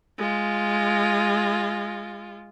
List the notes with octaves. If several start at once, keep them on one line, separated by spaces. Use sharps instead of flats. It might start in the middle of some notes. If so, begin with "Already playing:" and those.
G#3 F4